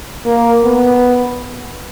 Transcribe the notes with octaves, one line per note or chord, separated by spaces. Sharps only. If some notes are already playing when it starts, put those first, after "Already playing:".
A#3
B3